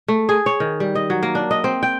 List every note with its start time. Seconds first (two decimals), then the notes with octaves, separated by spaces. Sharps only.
0.08 A3
0.29 G#4
0.46 C#5
0.60 D#3
0.80 G3
0.95 D#5
1.10 F#3
1.23 A#3
1.35 D4
1.51 D#5
1.64 C4
1.83 G5